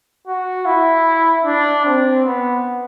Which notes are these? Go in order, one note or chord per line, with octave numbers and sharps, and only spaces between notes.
F#4
E4
D4
C4
B3